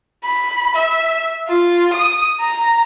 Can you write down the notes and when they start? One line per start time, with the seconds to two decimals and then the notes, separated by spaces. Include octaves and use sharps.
0.24 B5
0.75 E5
1.48 F4
1.93 D#6
2.40 A#5